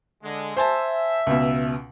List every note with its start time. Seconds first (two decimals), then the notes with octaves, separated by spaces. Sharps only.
0.23 D3 G#3
0.57 C5 E5 G#5 A5
1.27 C#2 B2